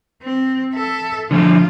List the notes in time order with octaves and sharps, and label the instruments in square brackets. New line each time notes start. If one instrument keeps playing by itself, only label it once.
[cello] C4
A4 E5
[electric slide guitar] D3 F3 A3 [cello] F4